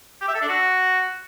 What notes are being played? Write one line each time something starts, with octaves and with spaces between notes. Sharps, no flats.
G4
E5
A4
D4
F#4